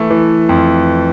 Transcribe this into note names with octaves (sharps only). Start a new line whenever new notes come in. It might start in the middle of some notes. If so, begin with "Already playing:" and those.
Already playing: E3 A3 E4
E3
F2